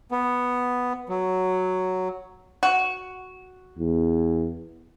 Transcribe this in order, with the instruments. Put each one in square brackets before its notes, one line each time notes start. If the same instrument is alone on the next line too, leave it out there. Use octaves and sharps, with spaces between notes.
[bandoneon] B3
F#3
[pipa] F#4
[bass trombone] E2